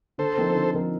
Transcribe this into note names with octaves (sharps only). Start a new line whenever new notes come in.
D3 A4 C5
F3 C4 D#4 A#4
D3
F3 C4 D#4 A#4